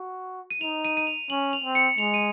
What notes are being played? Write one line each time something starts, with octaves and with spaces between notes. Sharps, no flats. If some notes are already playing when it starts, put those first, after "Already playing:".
Already playing: F#4
D#7
D#4 F7
D#7
D#7
F7
C#4 F#7
F7
C4
C#7
G#3 F7
D#7